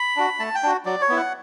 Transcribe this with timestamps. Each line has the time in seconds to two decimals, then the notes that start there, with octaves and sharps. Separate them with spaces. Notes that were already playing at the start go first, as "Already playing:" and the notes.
Already playing: B5
0.17 D4 F#4
0.39 A3 A5
0.55 G5
0.63 D4 F#4
0.85 F#3 D5
1.01 C#5
1.09 B3 E4
1.17 F#5